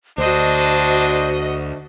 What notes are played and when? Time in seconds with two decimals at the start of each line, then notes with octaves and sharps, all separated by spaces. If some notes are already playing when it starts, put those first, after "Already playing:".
0.18 D2 D4 F#4 C5 D#5